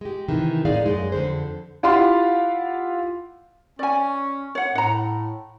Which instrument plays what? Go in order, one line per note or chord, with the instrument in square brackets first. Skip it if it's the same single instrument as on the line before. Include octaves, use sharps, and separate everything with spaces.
[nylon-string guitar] G#3 G4
C3 D#3 E3
A2 G#3 D#4 G#4 D5 F5
F#2 G#3
F2 D3 C5
[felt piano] E4 F4 G4 F5 F#5 C6
[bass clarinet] C#4 [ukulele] D5 G#5
[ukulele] C#5 F#5
[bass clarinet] A2 [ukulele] F#5 A#5